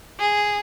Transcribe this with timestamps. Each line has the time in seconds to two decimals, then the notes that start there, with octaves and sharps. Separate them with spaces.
0.20 G#4